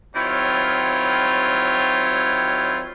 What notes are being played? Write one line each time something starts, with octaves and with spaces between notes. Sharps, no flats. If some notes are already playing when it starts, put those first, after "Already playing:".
D#3 F#3 C4 E4 F4 C#5